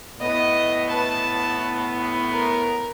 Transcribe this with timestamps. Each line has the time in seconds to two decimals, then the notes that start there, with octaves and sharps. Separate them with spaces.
0.20 A2 B3 D#5
0.88 B4 A5
2.31 A#4